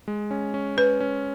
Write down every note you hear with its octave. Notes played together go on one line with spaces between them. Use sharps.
G#3
C#4
C#4
C#4 B4
C#4